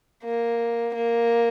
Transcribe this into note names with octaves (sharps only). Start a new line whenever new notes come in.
A#3
A#3